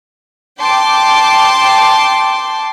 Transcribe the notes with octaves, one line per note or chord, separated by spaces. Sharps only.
G5 A5 C6 D6